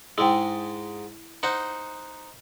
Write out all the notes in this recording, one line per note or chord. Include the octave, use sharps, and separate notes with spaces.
G#2 G#3 E4 G5
D#4 C5 F#5